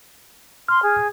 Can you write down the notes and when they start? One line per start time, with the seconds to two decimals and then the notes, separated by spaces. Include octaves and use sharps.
0.68 C6 F6
0.82 G#4